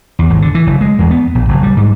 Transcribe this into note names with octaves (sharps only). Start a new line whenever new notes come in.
E2
G#1
D3
E3
F#1
G#3
E2
B3
A#1
F#1
G3
G#2